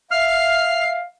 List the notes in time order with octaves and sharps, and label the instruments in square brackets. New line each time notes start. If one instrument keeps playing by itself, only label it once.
[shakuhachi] E5 [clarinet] F5 [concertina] F6 [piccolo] C7